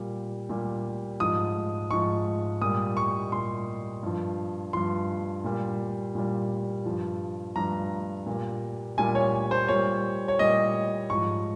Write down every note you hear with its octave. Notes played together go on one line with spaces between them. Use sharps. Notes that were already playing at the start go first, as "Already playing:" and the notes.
Already playing: A#2 G3
A#2 G3
G#2 F3 D#6
G#2 F3 C#6
A#2 G3 D#6
C#6
A#2 G3 C6
G2 F3
G2 F3 C6
A#2 G3
A#2 G3
G2 F3
G2 F3 A#5
A#2 G3
A#2 G3 G#5
C#5
C5
A#2 G3 C#5
C#5
A#2 G3 D#5
G#2 F3 C#6